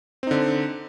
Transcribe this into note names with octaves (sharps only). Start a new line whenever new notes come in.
D3 C4 D#4